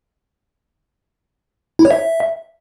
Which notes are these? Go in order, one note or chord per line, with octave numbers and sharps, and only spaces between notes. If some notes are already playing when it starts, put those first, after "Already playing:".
E4
C#5
E5